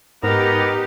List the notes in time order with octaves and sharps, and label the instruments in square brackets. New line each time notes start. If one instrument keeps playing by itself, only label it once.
[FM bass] G#2 [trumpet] B3 [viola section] D#4 G4 [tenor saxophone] A#4